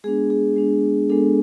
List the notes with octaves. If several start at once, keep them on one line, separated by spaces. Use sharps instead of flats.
G#3 B3 D4 G#4
G#4
G#3 B3 D4
G#3 B3 D4 A4